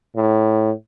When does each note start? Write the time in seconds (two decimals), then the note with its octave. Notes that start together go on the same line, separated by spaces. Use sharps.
0.16 A2